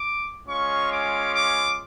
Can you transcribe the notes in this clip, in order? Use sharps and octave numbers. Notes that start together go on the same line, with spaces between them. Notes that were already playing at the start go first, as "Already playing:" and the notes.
Already playing: D6
G#3 C#4 F4 C#6
D6
D6